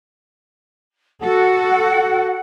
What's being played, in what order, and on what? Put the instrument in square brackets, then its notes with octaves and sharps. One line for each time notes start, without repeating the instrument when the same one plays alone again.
[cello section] F#4 A4 [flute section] F#5